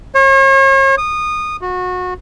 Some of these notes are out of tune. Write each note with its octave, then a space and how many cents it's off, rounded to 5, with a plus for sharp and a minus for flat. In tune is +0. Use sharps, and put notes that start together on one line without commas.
C#5 -40
D#6 -20
F#4 -25